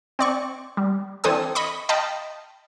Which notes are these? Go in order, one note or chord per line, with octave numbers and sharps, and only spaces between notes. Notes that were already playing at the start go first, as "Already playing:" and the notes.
C4 D5 C#6
G3
E3 C4 D4 A4 G#5 D#6
D#5 B5 C#6
D#5 F5 G5 A5 B5